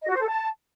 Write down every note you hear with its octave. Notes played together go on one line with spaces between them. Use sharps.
D#5
F#4
C5
A4
A5